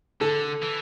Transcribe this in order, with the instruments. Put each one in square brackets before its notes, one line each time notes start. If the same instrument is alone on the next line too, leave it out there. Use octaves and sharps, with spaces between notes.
[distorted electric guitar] D3 [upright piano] A4
[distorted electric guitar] E3